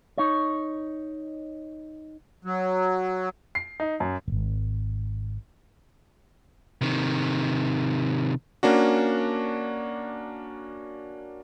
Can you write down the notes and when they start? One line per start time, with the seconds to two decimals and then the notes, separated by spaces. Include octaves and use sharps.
0.18 D#4 C#5
2.45 F#3
3.55 C7
3.80 D#4
4.00 F#2
4.28 D#1 G#1
6.81 C3 D#3
8.63 A#3 C#4 D4 F#4